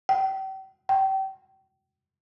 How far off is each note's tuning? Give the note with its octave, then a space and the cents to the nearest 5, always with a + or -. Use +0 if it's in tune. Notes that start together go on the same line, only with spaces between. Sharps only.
G5 -40
G5 -30